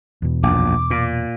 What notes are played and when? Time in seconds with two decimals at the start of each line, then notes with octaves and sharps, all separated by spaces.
0.22 E2 B2
0.43 A#1 F#2 D6
0.90 A#2